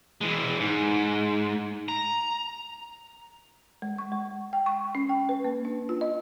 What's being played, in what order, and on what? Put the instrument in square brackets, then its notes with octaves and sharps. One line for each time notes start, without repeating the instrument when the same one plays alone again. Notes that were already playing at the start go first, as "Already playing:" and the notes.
[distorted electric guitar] E3 G#3
G#2
A#5
[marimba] G#3
C#6
G#3
G5
C#6
C#4
G5
B4
A#3
D4
F4
D#5